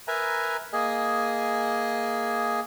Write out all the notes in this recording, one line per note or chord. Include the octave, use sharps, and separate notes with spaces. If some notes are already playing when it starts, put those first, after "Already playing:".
A#4 B4 E5 G#5 A#5
A#3 G#4 D#5 G#5